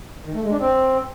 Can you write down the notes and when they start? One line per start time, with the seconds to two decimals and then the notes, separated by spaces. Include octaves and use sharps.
0.25 D#3
0.33 A3
0.42 G#3
0.50 D4
0.59 C4